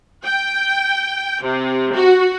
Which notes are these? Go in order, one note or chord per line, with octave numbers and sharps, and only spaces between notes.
G5
C3
F#4